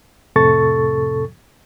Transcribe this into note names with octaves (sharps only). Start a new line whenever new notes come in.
F2 A2 C3 A4 C#6 A6